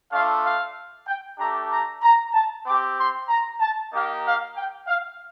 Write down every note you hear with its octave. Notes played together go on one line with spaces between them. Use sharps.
A3 D4 F4 F5
F5
G5
A3 D4 G4 A#5
A#5
A#5
A5
C4 G4 D6
C6
A#5
A5
A#3 D#4 G4 F5
F5
G5
F5